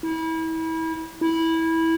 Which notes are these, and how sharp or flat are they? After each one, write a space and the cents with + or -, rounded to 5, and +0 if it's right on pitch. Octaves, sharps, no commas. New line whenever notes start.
E4 -30
E4 -15